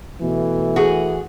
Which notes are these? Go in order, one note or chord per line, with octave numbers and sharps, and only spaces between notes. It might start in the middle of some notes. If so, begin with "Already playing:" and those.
B2 E3 A3
F#4 G#4